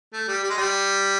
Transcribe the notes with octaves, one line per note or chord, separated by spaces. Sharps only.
A3
G3
G3
G#3
G3